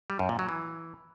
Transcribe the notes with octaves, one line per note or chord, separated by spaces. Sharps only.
G3
F#2
A#2
F#3
E3